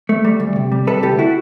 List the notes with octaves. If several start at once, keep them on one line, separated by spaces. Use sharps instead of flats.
A3
G3
D2
C3
G3
C3 A4 B4
D2 G4 A4
E4 F#4